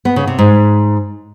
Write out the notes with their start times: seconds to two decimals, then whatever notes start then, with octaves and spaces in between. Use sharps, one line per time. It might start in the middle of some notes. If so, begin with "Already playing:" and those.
0.05 B3
0.16 C#3
0.27 C3
0.39 G#2